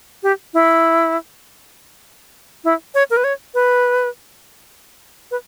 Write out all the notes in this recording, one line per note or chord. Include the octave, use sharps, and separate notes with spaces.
G4
E4
E4
C#5
A#4
B4
C#5
B4
B4